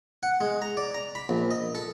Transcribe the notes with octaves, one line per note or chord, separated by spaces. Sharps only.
F#5
G#3
A#5
D5
A#5
B5
A#1
D#5
A4